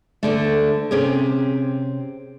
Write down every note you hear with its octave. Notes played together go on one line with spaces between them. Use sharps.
D2 D3 A3
C3 C4 C#4 G4 G#4